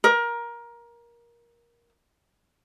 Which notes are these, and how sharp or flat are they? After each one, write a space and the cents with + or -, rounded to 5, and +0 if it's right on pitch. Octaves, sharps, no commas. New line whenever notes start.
A#4 +20